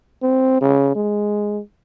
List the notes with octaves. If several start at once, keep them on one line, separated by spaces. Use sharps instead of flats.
C4
C#3
G#3